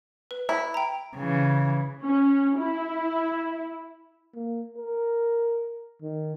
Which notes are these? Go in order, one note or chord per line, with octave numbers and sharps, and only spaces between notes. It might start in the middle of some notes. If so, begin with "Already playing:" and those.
B4
E4
G5 A#5
C#3 E3
C#4
E4
A#3
A#4
D#3